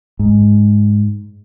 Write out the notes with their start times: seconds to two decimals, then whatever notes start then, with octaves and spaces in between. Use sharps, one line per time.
0.19 G#2